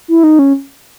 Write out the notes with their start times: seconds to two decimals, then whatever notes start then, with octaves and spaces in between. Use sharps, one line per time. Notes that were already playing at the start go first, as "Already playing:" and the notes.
0.08 E4
0.23 D#4
0.39 C#4